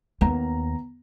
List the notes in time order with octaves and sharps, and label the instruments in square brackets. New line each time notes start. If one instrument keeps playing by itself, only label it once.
[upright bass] D#2 [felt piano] B3 A#5